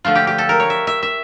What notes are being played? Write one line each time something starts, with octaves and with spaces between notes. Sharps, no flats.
D3 F3 A3 F4
G4
G4
A4
A#4
C#5
E5
E5
E5